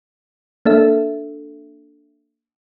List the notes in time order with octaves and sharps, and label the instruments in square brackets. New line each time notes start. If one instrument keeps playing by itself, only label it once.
[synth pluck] A#3 D4 A4 E5